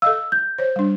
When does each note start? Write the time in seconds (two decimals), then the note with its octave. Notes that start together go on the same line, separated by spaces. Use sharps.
0.02 A4 D#5 F5 E6
0.32 G6
0.58 C5 C#5
0.76 G3 D4